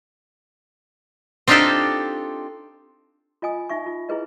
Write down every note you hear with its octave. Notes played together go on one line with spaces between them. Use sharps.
C4 D4 D#4 F4 G4 A4
F4 D#5 G#5 D#6
D#4 E5 C#6
F4
E4 G#4 B4 D#5